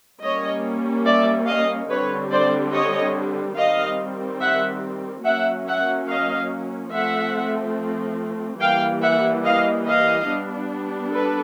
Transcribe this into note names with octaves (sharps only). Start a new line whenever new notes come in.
G3 A#3 C#4 C#5 D#5
D5 E5
D#5 F5
D3 G3 C4 B4 C#5
C5 D5
C#5 D#5
D#3 G3 C4 D#5 F5
E5 F#5
F#3 A#3 C#4 E5 F#5
E5 F#5
D#5 F5
F3 A3 C4 E5 F#5
E3 G3 A#3 F5 G5
E5 F#5
D#5 F5
D#5 F5
G3 B3 D4
A4 B4